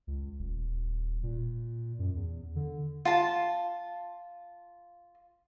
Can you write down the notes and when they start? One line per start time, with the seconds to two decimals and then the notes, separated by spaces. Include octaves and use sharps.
0.07 C#2
0.39 D#1
1.23 A#2
1.99 F#2
2.16 E2
2.56 D3
3.05 F4 A5